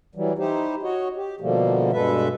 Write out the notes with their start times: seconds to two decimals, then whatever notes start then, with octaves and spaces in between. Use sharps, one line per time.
0.15 E3 F#3 G3
0.39 D#4 E4 G4 C5
0.83 F#4 C#5 D#5
1.16 G4
1.41 B2 D3 F3 G3 A3 A#3
1.93 G2 B2 G#3 A4 B4 E5